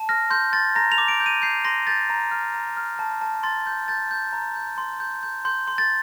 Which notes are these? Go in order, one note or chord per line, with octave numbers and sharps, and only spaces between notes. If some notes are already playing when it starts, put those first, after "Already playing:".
Already playing: A5
F6 A#6
C6 G6
C6 A6
A#5 A#6
F7
D6
D7
G6
D#7
G6 C7
C6 A#6
G6 A6
A#5
F6
A#5
F6
A5
A5
C6 A6
G6
G6 A6
G6
A#5
G6
C6
G6
G6
C6 G6
C6
A6